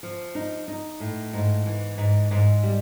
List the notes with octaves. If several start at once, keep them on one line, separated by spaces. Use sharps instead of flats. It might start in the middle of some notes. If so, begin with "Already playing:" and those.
F3
D#4
D#4
A2
G#2
E3
G#2
G#2
G3